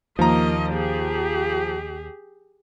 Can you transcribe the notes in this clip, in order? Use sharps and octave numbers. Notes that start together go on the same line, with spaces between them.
D#2 F3 A#3 D#5 A#5
G4 G#4